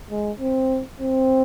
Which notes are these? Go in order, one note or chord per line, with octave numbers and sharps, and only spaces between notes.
G#3
C4
C4